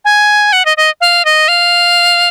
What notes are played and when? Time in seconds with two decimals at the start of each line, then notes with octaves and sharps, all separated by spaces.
0.05 G#5
0.53 F#5
0.65 D#5
0.77 D#5
1.01 F5
1.25 D#5
1.48 F5